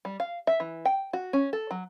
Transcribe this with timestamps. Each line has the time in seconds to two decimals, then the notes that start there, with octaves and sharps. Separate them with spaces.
0.05 G3
0.20 F5
0.47 E5
0.60 E3
0.85 G5
1.13 F#4
1.33 C#4
1.53 A4
1.71 F#3